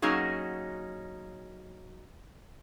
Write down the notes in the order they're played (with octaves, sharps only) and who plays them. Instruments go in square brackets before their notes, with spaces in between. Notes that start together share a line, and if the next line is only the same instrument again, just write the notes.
[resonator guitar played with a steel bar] F#3 A#3 C#4 D#4 F#4 G#4